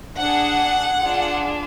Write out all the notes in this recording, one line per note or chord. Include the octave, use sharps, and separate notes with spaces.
D4 G#4 F#5
D4 F4 G#4